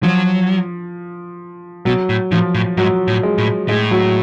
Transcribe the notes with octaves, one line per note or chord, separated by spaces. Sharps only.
F3 F#3
B2 F#3
A2
A2 F3
A2
G#2 F#3
A2
G#3
A2
A2 G#3
F#3